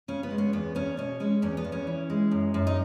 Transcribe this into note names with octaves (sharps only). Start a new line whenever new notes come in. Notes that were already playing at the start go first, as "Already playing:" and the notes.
C#3 C#4
B3
G#3
C#4
E2 B3
E2 C#4
B2 C#4
G#3 C#4
E2 C#4
B3
E2
C#4
E3
G#3
F#2
F#2
D#4